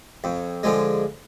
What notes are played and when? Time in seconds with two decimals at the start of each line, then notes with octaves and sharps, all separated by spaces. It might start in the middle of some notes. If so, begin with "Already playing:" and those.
0.24 F2
0.63 D3 F3 G#3